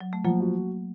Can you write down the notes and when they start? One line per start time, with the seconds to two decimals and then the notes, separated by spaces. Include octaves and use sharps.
0.01 F#3
0.13 A3
0.24 F3 F#3 A#3
0.40 F#4